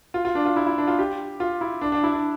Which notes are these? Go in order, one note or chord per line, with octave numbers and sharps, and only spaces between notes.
F4
F4
D4
F4
E4
E4
D4
F4
G4
F4
E4
D4
D4
E4
D4